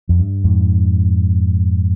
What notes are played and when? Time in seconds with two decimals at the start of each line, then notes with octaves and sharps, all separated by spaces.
0.09 F2
0.19 G2
0.44 F2 G#2